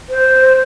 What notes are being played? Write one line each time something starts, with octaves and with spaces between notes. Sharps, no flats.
C5